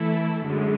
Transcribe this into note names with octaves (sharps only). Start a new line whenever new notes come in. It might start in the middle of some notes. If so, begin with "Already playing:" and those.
Already playing: E3 A3 E4 A4
F#2 D3 G#3